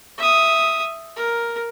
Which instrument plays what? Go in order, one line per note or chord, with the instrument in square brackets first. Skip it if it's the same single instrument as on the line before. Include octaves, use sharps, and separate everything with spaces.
[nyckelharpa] E5 D#6
A#4